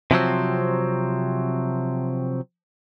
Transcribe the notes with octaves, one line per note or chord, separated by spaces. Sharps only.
C3 F3 F#3 C4